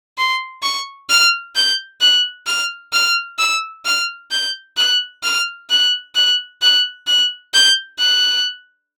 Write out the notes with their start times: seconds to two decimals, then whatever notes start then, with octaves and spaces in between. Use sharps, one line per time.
0.18 C6
0.62 C#6
1.09 F6
1.56 G6
2.01 F#6
2.46 F6
2.92 F6
3.38 E6
3.85 F6
4.31 G6
4.77 F#6
5.23 F6
5.70 F#6
6.15 F#6
6.62 F#6
7.07 F#6
7.54 G6
7.99 F#6